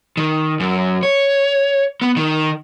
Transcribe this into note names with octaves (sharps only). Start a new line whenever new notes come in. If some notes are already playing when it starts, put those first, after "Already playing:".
D#3
F#2
C#5
B3
D#3